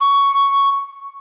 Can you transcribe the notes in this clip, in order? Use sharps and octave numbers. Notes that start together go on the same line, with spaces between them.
C#6